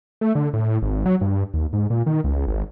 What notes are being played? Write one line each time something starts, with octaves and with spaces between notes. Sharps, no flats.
A3
D3
A2
G#1
F#3
G2
D#2
G#2
A#2
D#3
C#2
G#1